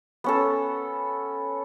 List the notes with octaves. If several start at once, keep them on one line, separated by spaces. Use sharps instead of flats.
B3 C#4 A4